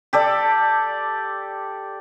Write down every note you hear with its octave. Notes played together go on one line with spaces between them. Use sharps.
G4 A4 D5